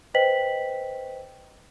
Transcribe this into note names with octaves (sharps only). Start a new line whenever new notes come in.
B4 C5 D#5 G5 B6 F#7